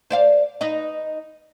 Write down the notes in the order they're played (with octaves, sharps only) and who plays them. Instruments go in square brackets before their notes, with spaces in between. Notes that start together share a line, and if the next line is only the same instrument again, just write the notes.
[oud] C5 D5 F5
D#4 B4 D#5